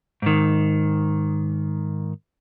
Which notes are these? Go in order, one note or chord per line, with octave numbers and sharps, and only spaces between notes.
G#2 D#3